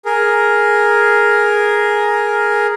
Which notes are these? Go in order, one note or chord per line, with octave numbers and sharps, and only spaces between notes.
G#4 A#4